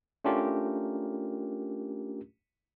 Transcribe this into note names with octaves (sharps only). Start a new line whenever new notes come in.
A3 C#4 D4 F4 G4 A#4